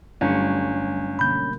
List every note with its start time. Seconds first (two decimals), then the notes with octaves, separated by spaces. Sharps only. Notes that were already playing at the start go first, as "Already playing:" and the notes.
0.21 G1 F#3 G3 A3 C#4
1.19 B2 D3 A#3 B5 G6